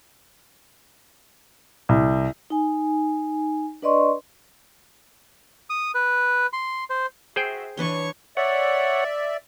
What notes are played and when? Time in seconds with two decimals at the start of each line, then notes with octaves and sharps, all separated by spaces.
1.89 C2
2.50 D#4 G#5
3.82 D4 B4 D5 D#5 C6 C#6
5.70 D#6
5.95 B4
6.53 C6
6.90 C5
7.36 F#4 G#4 C5 E5 G5
7.77 E3 D4 B4 C#5 C6 C#6
8.37 C#5 D5 E5 F#5